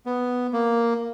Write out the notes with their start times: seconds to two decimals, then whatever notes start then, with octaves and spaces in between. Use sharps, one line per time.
0.06 B3
0.53 A#3